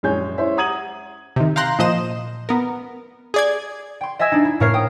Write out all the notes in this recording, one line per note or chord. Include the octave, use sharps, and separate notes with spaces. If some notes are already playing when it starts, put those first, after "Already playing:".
A#1 F#2 G#3 C#5 G#5 G6
C#4 E4 C5 E5
F#5 A#5 D#6 G#6 D#7 F#7
C3 D#3
F5 G5 A#5 C6 F#6
A#2 F3 C5 D#5 E7
B3 A#4
G#4 D5 G#6
G5 C6
D#5 E5 G#5 E6 G#6
D4 D#4
E4
A2 A#3 A#4 C#5 F6 C7
G5 D#6